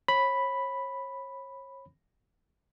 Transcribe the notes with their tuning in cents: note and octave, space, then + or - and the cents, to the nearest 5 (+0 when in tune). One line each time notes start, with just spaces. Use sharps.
C#5 -35 B5 +0